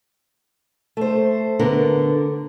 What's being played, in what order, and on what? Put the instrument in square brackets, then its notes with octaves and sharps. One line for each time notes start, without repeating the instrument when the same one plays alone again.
[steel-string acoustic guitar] A3 C5
[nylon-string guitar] D3 B3 A#4